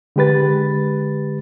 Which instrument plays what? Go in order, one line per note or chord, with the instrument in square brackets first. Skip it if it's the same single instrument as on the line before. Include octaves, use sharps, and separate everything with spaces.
[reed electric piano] D3 G#3 G4 B4 A6